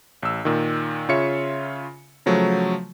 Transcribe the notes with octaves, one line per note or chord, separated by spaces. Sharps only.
A1 E6
A#2 D#3
C#3 F4 C#5 E5 C#7
C#3 F3 F#3 A3